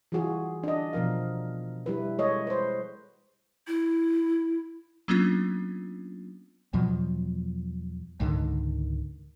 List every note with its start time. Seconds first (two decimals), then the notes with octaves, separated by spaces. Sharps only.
0.12 E3 G3 F4 F#4 G#4
0.64 D4 D#5
0.93 B2 F3 A#4 F5
1.86 G3 E4 B4
2.18 G#3 A4 C#5 D#5
2.47 B4 C5
3.67 E4
5.08 F#3 A#3 B3 C#4 D4 F4
6.73 E2 B2 F3 F#3
8.20 C#2 G#2 D3 D#3